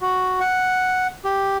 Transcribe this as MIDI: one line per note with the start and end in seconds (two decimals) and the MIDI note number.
0.01 0.39 66
0.40 1.07 78
1.24 1.57 67